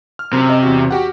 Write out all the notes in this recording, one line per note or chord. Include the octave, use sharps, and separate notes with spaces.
F6
F#2 C3
D#5
E2 F#4
F#4 G4 F#5